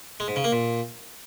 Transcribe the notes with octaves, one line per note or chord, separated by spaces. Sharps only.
G#3
G#2
C#3
A#3
A#2